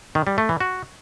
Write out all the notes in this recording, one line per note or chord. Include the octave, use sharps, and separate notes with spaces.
D#3
G3
A3
E3
F#4